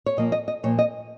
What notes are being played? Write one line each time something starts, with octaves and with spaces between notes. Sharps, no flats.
C#5
A#2 F3 A#3 D#5
D#5
D#5
A#2 F3 A#3 C#5
D#5